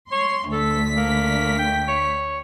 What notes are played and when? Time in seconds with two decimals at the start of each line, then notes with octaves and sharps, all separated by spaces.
0.12 C#5 C6
0.52 D2 A4 B6
0.97 A#3
1.58 G5
1.88 C#5